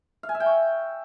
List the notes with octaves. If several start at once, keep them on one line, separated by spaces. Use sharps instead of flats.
F5
G#5
E5
G5
C#6